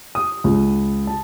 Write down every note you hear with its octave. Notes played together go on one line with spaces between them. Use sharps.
D#6
C#2
A5